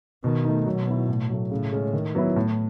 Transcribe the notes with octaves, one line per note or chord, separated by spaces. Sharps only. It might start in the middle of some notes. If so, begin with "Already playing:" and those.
B2 D#3
A3 D#4
B2 F#3
B3 E4
A2
F#3 A3
A2 C#3
G#3 C#4
D#3
F#3 B3 E4
A2